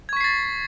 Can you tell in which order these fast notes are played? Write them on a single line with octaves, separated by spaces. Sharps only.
G#6 C#6 B6 C7 A6